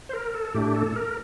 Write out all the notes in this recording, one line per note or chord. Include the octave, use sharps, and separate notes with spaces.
C5
A#4
A4
A2 A3 D4 G4
A4
A#4